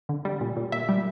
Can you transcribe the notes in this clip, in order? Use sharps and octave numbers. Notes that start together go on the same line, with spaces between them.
D3
G3
A#2
A#2
A#2 E5
G3